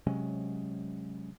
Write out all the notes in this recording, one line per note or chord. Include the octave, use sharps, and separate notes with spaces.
C3 F#3 G#3 C#4